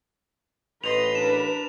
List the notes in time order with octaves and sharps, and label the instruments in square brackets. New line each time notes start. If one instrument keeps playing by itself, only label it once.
[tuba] A1 [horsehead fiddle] B4 [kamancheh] D#5 C6 [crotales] F7
[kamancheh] D4 A#4 [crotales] E7